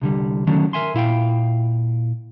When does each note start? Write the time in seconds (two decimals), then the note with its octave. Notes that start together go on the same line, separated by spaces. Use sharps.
0.02 C2 D3 G3
0.47 D3 D#3 F#3 A3 C#4 D4
0.73 A#4 E5 G#5 C6
0.94 A#2 E4 F5 G5